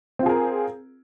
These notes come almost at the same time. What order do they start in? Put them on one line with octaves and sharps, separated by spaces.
C4 F4 G#4 A#4